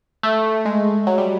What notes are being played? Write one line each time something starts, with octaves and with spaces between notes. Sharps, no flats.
A3
G#3
F#3
G3